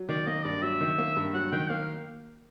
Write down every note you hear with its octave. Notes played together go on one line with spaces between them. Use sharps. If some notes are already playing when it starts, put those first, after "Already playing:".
Already playing: F#3
D#3 D5
A#3 D#5
G2 D5
F#3 E5
D#3
A#3
G2
F#3 F#5
D#3 G5
A#3 F5